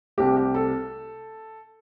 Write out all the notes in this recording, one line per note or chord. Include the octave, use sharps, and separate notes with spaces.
C2 C3 A3 G4
G4
A4